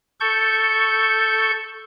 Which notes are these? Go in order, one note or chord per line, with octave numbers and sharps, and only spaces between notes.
A4 C#6 G6